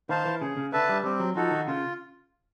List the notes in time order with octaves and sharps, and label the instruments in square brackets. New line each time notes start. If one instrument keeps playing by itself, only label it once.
[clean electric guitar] D#3 [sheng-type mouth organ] C5 F5 A5
[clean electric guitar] E3
[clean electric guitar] C#3 [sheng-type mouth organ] G#4
[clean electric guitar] C#3
[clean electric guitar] D3 [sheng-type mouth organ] B4 E5 A5
[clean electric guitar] G3
[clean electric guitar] G3 [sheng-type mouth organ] C4
[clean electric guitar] F#3
[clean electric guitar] F3 [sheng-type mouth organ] D#4 F#4 A4
[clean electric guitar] D#3
[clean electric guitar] C#3 [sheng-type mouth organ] F4